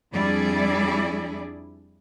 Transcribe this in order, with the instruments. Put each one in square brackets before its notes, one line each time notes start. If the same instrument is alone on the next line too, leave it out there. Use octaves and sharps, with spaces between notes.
[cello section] F2 G3 D4 E4 G#4 D5